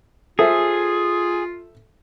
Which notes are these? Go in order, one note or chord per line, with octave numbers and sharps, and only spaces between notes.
F4 G#4 A4 C5 E5